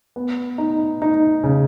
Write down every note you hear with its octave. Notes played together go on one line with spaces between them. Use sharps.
B3
D#4
D#4
C#3